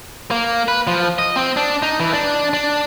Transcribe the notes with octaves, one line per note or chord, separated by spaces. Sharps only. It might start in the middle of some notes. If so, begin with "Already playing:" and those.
A#3
B4
F3
D#5
C4
D4
D#4
E3
D4
D4